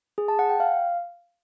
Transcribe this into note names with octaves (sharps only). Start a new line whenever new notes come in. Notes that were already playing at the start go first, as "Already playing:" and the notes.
G#4
A5
F#5
G5
F5